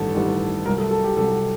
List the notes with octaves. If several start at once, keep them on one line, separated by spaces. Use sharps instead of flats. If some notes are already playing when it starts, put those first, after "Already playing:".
Already playing: A1 G2 D#3 G3 A4
A1 G2 D#3 G3
C2 C3 F#3 A#4
A4
A4
G4
C2 C3 F#3 A4